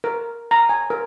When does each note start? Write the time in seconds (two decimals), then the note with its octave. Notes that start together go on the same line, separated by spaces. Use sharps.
0.04 A#4
0.51 A#5
0.69 G#5
0.90 A#4